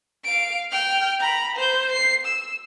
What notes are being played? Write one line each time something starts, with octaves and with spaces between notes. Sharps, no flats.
F5 D7
G5 F6
A#5 B5
C5 G6
C7
E6